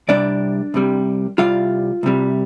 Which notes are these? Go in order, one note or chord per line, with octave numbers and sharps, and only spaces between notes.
C2 C3 G3 D4 D5
C2 C3 G3
C2 C3 G3 F4 F5
C2 C3 G3